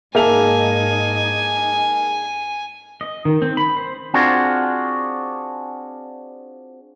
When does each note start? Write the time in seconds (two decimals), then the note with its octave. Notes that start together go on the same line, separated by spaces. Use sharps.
0.15 G#2 A#3 D#4 G#4 E5 G#5 A5 F7
3.01 D#5
3.25 D#3
3.42 C4
3.57 B5
3.77 C5
4.14 C4 D4 F4 F#4 G#4 C5